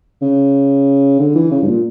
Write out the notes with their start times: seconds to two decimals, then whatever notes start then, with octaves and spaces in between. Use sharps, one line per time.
0.22 C#3
1.19 D3
1.35 E3
1.51 C#3
1.62 G2
1.67 A#2